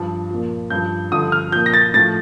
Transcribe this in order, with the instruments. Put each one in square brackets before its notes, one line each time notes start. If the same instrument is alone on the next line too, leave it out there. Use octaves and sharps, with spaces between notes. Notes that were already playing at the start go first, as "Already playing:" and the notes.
Already playing: [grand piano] G2 F3
A#2 F3
G2 F3 G6
G2 D3 F3 D#6
F6
A#2 F3 G6
A#6
A6
A2 F3 A6